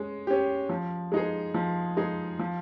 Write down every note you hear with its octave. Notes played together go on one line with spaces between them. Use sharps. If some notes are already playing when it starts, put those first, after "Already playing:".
Already playing: G#3 C#4
C#4 G4
F3
G#3 D#4 G#4
F3
G#3 D#4 G#4
F3